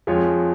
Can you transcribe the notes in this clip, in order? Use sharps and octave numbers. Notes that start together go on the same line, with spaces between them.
F2 F3 G#3 F4 C#5